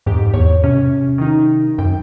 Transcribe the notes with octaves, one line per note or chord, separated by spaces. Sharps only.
F2 G#2 G4
E2 C#5
C3 C#4
D#3 D#4
F#2 G5